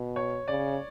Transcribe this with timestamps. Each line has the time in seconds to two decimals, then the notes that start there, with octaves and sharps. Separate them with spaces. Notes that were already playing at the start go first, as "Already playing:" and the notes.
Already playing: B2
0.16 C#5
0.48 C#3 D5